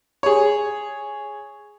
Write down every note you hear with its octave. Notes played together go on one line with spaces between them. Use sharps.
G#4 C#5